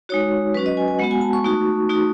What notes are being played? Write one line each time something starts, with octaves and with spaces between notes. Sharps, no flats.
G#3 D#4 F#4 C#5
F#3 C#4 F#4 B4
D#5
G#5
G#5
G#3 B3 F#4 F#5
G#5
A5
C#6
A3 D#4 F#4
A3 D#4 F#4